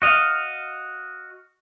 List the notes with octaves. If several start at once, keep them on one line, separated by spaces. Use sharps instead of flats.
F#4 D#5 F5